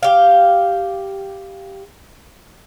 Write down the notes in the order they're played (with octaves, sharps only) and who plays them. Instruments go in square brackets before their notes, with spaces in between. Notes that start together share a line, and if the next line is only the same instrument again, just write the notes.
[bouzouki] G4 F5